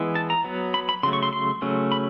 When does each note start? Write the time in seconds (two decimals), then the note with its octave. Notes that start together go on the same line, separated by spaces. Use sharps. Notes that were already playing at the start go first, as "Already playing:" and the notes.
Already playing: E3 G#3 B3
0.15 A5
0.30 A#5
0.44 F#3 B3
0.74 B5
0.89 B5
1.03 C#3 F#3 A3 C6
1.13 C#6
1.23 C6
1.33 C6
1.62 C#3 F#3 A3 C#4
1.92 B5